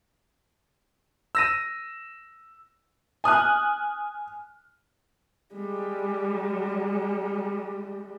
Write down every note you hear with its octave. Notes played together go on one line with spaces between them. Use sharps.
E6 A#6 D#7
G#5 D#6 F6 F#6
G3 G#3